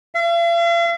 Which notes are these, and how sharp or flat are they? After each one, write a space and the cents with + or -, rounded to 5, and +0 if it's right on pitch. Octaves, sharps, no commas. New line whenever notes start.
F5 -45